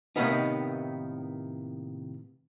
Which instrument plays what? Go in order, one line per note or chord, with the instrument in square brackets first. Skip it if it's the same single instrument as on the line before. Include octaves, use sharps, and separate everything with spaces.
[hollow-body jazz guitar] A2 C3 D#3 A#3 B3 D#4